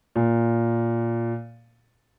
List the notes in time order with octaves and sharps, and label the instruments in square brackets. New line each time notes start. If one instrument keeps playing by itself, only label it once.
[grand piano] A#2